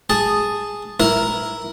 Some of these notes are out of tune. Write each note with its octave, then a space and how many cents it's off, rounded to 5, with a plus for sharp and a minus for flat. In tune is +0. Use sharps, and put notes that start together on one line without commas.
G#4 -5 A5 +0
E4 +0 A#4 +0